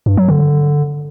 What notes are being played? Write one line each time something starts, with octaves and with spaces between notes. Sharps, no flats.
G2
F#3
D3